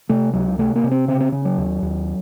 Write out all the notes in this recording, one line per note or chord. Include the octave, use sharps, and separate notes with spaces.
C3 A3
C#2 F#3
C3 A3
A#3
C3
C4
C#3 C4
C4
C#3 C#4
F#3
D#2
D#2